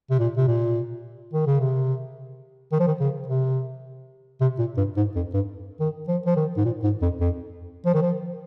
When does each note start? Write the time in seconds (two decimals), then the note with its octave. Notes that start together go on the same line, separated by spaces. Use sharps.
0.10 C3
0.19 A#2
0.37 C3
0.47 A#2
1.33 D#3
1.47 C#3
1.60 C3
2.72 D#3
2.80 F3
2.87 D#3
3.00 C#3
3.28 C3
4.41 C3
4.59 A#2
4.77 G2
4.97 G#2
5.15 F2
5.34 G2
5.80 D#3
6.08 F3
6.26 F3
6.36 D#3
6.57 G#2
6.65 A#2
6.83 G#2
7.02 F2
7.20 F2
7.86 F3
7.94 D#3
8.02 F3